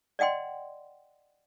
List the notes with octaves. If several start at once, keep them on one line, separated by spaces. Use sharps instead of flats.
D5 D#5 F#5 G5 C6